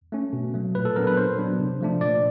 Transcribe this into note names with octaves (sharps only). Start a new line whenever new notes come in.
A3 C#4
B2
F#3 A3
A#2 B4
A4
F#3 B3 D4 A#4
B4
A#2 C5
F#3 B3 D4
C3
F3 A3 D4
A#2 D5